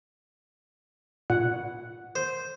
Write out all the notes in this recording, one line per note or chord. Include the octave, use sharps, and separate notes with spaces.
A#2 F#5
C5